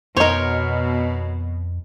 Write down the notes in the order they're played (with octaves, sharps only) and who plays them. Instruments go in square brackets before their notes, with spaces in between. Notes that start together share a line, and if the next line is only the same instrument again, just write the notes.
[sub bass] F2 [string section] B2 [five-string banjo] D#4 C5 [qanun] A#4 C#5